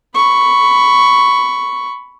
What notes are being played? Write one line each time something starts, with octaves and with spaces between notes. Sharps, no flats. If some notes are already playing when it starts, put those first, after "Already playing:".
B5 C#6